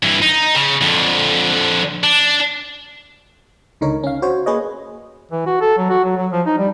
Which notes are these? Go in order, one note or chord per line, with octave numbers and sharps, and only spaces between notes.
G2 E3
D#4
C#3
F2 D3
D4
C#2 D3 D#4 A#4 C#5
C#4 F5
F#4 C5 C#5
A#3 G#4 B4 C#5 D#5
E3
F#4
A4
F#3
F#4
F#3
F#3
F3
D#4
G3